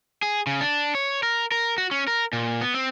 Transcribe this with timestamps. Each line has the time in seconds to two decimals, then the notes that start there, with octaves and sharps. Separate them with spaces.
0.22 G#4
0.47 C#3
0.61 D4
0.95 C#5
1.23 A#4
1.52 A#4
1.78 F#4
1.91 C#4
2.08 A#4
2.33 A#2
2.61 B3
2.74 C4